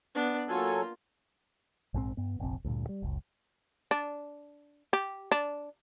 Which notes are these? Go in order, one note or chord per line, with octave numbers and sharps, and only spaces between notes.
B3 D4
F#3 A#3 F4 A4 G#5
A#1 G#2 C#3 C4
G2 B3
F1 A#1 C4
D2 G2 A#2
G3
F#1 C#2
D4
G4
D4